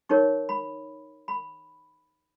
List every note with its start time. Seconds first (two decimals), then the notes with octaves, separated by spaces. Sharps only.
0.09 D#4 A#4 C#5 C#6
0.49 B5
1.28 B5